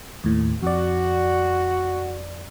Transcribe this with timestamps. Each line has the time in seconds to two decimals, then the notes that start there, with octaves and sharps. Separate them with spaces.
0.24 D#2 A2
0.63 F2 F#4 D5